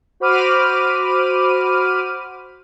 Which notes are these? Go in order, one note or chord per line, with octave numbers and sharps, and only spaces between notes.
F#4 C5 B5 D6 F6 D#7